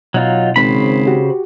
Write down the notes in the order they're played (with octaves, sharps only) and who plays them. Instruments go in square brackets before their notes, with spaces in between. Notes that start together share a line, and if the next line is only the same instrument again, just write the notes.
[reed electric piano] B2 [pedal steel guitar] F#3 D#4 F4
[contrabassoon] G#1 [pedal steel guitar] C#3 C5 B5
[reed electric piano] F#4 G4